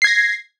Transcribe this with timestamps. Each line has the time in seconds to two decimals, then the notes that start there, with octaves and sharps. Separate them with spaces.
0.02 C7
0.04 G#6
0.07 A#6